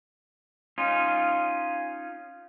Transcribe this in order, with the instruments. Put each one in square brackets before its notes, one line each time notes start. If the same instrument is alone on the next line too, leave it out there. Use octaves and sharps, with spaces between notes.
[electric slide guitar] C#4 D#4 F4